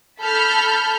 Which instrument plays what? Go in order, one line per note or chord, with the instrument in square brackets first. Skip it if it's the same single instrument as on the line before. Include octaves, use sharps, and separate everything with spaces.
[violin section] A4 A5 B5 F6 G6